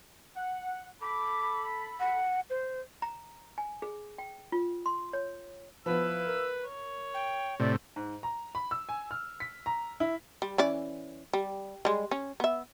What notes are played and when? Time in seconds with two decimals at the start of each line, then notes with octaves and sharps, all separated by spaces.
0.36 F#5
1.02 A4 B5 D6
2.00 F#5
2.50 C5
3.02 A#5
3.58 G#5
3.82 G#4
4.18 G5
4.52 F4
4.86 C6
5.13 C#5
5.86 F3 B3 E4 B4 F5 E6
6.26 A#4
6.64 C#5
7.14 G5
7.60 A2 C3 D5
7.96 G#2
8.23 A#5
8.55 B5
8.71 E6
8.89 G#5
9.11 F6
9.40 B6
9.66 A#5
10.00 E4
10.42 G3
10.58 E3 C#4 D5
11.33 G3
11.85 G3 G#3
12.11 C#4
12.40 B3 E5